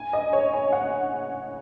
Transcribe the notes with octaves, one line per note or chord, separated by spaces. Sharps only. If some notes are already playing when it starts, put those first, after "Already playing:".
Already playing: G#5
D#5
C#5
G#5
F#5